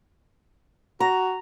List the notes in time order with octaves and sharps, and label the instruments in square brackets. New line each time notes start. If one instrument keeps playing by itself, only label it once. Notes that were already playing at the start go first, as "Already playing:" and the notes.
[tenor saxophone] F#4 [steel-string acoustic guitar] A#5